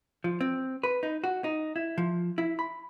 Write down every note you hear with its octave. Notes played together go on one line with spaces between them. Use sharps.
F3
C4
B4
D#4
F#4
D#4
E4
F3
E4
B5